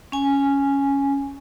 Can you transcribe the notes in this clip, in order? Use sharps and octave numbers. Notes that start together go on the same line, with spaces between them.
C#4 G#5